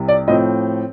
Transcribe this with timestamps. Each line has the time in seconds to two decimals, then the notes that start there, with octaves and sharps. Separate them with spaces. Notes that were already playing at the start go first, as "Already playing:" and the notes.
Already playing: C2 C3
0.08 D5
0.27 A2 F3 C4 D#5